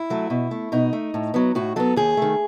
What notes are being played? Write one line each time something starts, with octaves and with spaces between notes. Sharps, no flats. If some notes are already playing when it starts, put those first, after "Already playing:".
Already playing: E4
F#3 A3
B2
A3
B2 D#4
A3
A2
F#3 B3
A2 F#4
F#3 B3 A4
D#2 G#4
D#3 A3